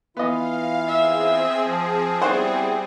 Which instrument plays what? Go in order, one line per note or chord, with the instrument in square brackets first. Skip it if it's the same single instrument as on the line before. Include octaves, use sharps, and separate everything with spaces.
[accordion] E3 E4 F4 [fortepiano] B3 D#5 [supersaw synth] F5
[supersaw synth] C4 G#4 [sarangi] E5
[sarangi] F3
[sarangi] G3 [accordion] B3 E4 G4 [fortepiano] C5 C#5 F#5